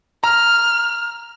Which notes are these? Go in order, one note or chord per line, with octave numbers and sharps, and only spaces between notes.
A#5 F6